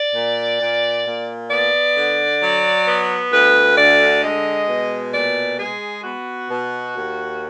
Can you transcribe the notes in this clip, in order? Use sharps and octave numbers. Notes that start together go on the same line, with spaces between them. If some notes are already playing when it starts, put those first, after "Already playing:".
Already playing: D5
A#2
A#2
A#2
B3 D5
D3
F#3
B3
D2 B4
D3 D5
G#3 D#5
B2
A#2 D5
G#3 G#4
B3 F#4
B2
D#2